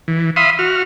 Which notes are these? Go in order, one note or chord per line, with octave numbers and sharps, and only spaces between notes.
E3
E5 F5 B5 C6 D#6
F#4 F6